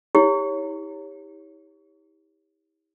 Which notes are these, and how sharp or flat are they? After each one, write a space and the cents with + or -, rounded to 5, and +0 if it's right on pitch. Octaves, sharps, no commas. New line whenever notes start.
E4 -45 G4 +25 C#5 +0